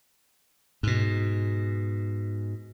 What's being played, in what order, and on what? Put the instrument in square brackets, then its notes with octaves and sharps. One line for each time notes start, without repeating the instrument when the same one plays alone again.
[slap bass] G#2 B2